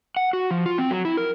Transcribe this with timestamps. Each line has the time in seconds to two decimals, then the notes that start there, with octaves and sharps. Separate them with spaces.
0.16 F#5
0.33 F#4
0.51 F3
0.66 F4
0.78 C4
0.91 F#3
1.05 E4
1.17 A#4